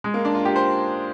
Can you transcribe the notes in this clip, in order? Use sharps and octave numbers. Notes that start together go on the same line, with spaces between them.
G#3
A#3
D4
F4
G4
C5